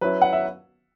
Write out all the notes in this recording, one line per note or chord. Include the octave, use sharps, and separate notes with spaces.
F#3 C#4 E4 B4
F#5
E5